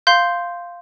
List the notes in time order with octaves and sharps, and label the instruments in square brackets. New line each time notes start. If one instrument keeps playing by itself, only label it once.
[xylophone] F5 C6 G6